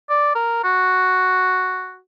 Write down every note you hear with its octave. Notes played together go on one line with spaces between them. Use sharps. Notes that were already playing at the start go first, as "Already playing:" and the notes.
D5
A#4
F#4